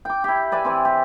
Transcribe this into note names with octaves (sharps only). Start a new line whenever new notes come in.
G5 D6
E4 G4
B4 D5 E5 G#5
E3 C4
G4